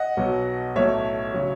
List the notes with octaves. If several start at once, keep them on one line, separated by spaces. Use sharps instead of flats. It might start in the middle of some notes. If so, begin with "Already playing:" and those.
Already playing: D#5 F#5
B1 B2 F#3
B1 A2 F#3 A3 C#5 E5
C#3 F#3